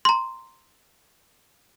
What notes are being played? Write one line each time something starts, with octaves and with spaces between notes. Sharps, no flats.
A#5 C6